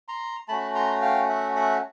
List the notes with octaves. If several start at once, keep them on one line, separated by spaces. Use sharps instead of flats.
A#5 C6
A3 C#4 F#4 A5 B5
A#5 C6
F5 G5
E5 F#5
E5 F#5